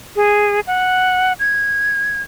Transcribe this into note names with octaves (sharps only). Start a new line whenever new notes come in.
G#4
F#5
G#6